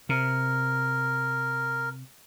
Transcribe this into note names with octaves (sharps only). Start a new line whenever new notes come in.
C3 A#4